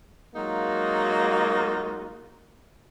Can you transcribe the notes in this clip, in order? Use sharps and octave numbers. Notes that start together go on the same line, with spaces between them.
F#3 G#3 A#3 D#4 F4 F#4